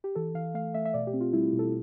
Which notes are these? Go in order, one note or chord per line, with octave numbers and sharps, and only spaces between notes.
G4
E3 A4
E3 F5
A3 F5
A3 E5
E5
B2 D5
G4
C4
F4
G3 E4
B2
A4